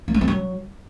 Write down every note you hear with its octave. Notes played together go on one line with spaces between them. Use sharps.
A#3
A3
C4
F#3